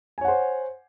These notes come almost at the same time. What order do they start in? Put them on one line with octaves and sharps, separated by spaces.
G#5 C#5 F#5 C5